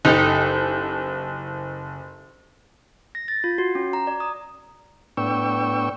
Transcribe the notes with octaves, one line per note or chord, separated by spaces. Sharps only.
F#1 D#4 G4 A4
A#6
A6
F4
F#4
C#4
A#5
D5
D#6
A2 B3 D4 G5 C#6 E6